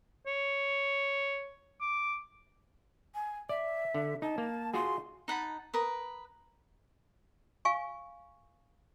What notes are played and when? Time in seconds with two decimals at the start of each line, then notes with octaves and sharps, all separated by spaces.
0.26 C#5
1.80 D6
3.15 G#5
3.49 D5 E5
3.94 D3
4.22 D#4 A5
4.38 A#3
4.74 F4 F#4 G#4 C6
5.28 D#4 F#5 A5 B5
5.74 A#4 B4 D#6
7.65 F5 G#5 C#6